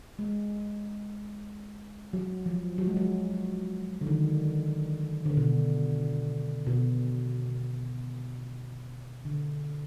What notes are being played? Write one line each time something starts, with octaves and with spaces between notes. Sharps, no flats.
G#3
F#3
F3
F#3
G#3
F#3
D3
D#3
D3
B2
B2
D3